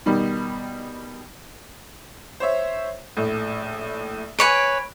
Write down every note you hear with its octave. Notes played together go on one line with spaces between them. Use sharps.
B2 D#3 G3
C5 C#5 E5
A#1 A2
B4 C#5 G#5 D7